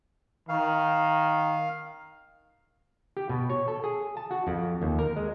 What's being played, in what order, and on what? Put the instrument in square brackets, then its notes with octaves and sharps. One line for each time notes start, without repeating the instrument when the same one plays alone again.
[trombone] D#3 [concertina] F5
[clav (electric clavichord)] G4
B2
C#5
A4
G#4
A5
F#4
F2
D#2
A#4
G#3